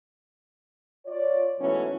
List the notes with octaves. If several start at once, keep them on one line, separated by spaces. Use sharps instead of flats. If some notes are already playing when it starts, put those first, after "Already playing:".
F4 C#5 D5
G#2 B2 E3 F#3 A3 C#4